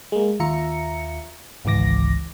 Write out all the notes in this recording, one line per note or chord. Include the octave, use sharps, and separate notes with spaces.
G#3 A#3
D#2 F4 E5 A#5 C#7
G#1 C#2 E3 D6 A#6